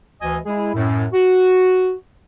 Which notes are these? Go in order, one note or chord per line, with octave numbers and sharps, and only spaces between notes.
D2 E3 D#5 G#5
G#3 E4 G#4
F#2 A2
F#4